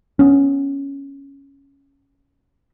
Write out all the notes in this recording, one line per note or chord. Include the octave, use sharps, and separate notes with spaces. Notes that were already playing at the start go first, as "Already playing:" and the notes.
B3 C#4